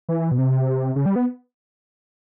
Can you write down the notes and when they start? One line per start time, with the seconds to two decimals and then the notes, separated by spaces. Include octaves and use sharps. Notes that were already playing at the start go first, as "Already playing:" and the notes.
0.09 E3
0.31 B2
0.38 C3
0.96 C#3
1.06 G3
1.16 B3